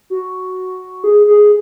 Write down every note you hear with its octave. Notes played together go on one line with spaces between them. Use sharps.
F#4
G#4
G#4